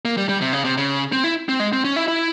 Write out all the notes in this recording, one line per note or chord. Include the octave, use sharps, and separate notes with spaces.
A#3
G3
G3
C3
C#3
C3
C#3
C4
E4
C4
G#3
C4
C#4
E4
E4